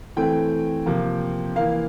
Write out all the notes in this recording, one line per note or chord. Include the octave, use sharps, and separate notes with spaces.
E3 A3 C4 G5
C3 F3 A#3
E3 A#3 F5